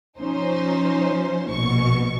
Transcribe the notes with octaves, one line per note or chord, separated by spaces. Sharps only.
F3 C#4 D#4 C5
A#1 B2 C#6